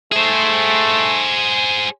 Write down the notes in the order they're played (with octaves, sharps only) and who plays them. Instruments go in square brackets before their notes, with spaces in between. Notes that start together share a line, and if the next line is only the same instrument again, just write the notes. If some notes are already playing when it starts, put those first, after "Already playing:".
[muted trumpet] A3 [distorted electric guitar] G#4 C5